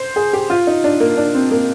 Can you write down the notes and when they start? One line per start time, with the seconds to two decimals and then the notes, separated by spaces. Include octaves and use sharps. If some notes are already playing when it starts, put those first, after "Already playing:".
Already playing: C5
0.16 G#4
0.33 G4
0.50 F4
0.67 D#4
0.84 D4
1.00 A#3
1.17 D4
1.35 C4
1.51 A#3